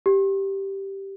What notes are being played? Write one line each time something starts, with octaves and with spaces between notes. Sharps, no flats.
G4